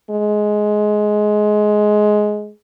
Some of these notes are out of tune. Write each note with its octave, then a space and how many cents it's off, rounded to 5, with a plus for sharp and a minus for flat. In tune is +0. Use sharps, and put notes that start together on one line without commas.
G#3 +15